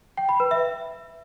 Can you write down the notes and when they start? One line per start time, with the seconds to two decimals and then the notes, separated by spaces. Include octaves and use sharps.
0.17 G5
0.29 B5
0.40 B4
0.51 E5